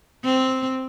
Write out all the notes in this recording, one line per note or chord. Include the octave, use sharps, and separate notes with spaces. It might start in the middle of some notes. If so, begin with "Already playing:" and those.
C4